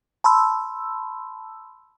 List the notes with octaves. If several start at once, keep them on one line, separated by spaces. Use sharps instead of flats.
A5 B5 C6 E6